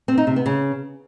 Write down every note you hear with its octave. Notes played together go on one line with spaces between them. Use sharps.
C4
D#4
C3
B3
C#3